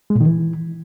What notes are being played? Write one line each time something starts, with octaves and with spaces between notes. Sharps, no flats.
G#3
A#2
D#3
E3